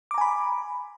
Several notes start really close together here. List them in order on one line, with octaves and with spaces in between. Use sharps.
D6 A#5 G#5 B5